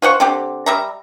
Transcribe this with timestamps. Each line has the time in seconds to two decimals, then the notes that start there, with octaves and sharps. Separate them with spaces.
0.02 F4 C5 F#5 C#6
0.20 D3 C4 G4
0.66 G3 E5 A#5